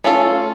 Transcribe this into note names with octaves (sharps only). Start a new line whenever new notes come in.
A3 C#4 F4 A4